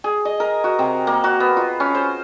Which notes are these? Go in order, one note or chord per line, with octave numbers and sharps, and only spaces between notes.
G#4
D#5
A#4
F#4
C3
A#3
F#4
B3
F4
C#4
C5